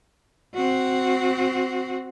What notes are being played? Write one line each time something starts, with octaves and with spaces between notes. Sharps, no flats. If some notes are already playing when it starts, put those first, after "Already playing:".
C4 F#4